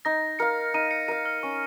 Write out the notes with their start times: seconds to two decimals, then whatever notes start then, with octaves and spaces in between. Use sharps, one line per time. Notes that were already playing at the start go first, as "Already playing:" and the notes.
0.05 D#4 A#6
0.39 A#4 F5 C#7
0.74 D#4 D#7
0.91 C#7
1.08 A#4 F5 D#7
1.25 F6
1.43 C#4 C#6